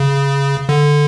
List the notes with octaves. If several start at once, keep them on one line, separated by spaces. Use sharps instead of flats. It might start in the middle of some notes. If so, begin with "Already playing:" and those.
Already playing: C#3
D3